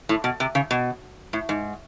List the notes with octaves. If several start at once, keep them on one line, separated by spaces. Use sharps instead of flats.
A2
B2
C3
C#3
B2
A2
G#2